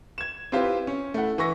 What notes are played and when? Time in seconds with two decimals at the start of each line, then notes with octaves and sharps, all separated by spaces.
0.18 G#6 E7
0.52 C4 E4 F4 G4 B4 C5
0.87 C#4
1.14 A3 E4 F#5
1.38 E3 E5 C#6 A#6